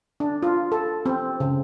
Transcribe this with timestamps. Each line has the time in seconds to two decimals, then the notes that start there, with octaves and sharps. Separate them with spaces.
0.20 D4
0.43 F4
0.72 A4
1.06 C4
1.40 C#3